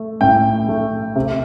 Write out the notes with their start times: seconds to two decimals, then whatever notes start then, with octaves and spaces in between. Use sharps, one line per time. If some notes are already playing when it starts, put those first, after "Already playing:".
Already playing: A3
0.21 A2 G5
0.69 A3
1.16 C3